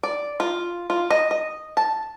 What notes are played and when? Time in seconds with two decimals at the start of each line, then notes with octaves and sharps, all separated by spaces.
0.03 D5
0.40 F4
0.90 F4
1.10 D#5
1.31 D#5
1.77 A5